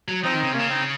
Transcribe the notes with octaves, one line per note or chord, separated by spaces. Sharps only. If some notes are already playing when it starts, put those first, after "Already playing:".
F#3
F3 C4 D#4
D#3
C#3
C3 A#3 C#4
C#3
C4 D#4